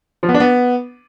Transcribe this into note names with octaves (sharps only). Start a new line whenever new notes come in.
F3
B3
D4
B3